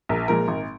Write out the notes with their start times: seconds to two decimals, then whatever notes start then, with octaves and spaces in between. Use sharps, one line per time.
0.09 A#1 A#4
0.28 A#2 F3 G#3 A#4
0.48 G#1